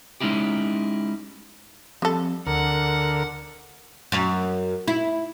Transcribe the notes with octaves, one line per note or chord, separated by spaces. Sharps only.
G#3 C#4 D#4 E4 G4
F3 G3 C4 A4
D2 D3 A#4 F#5
F#2
E4